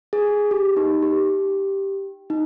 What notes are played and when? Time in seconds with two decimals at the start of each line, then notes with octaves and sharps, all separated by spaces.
0.13 G#4
0.51 G4
0.77 D#4
1.02 G4
2.30 D#4